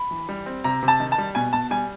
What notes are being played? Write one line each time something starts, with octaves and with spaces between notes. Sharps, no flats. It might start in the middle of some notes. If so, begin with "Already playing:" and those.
Already playing: B5
E3
G3
C4
C3 A#5
C3
A5
D#3
A5
G3
B2 G#5
B2 A5
G3 G#5